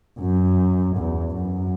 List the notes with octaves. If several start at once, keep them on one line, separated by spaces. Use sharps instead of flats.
F#2
E2
F#2